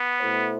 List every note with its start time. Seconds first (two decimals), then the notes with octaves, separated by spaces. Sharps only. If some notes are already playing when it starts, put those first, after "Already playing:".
Already playing: B3
0.21 B2 A3 E4 A4 C5